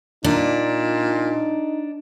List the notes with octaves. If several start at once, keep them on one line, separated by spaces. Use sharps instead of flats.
A#2 D4 D#4